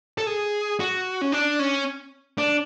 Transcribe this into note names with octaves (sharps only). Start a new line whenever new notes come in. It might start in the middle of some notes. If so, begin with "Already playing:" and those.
A4
G#4
F#4
C#4
D4
C#4
D4